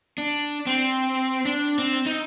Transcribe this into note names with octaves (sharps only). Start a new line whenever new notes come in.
D4
C4
D4
C4
D#4